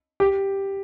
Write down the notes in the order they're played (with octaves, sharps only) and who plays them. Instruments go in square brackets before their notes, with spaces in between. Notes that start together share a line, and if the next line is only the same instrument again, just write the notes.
[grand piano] G4